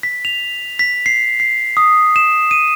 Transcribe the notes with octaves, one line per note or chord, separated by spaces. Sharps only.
B6
F7
B6
C7
C7
D#6
E7
D#7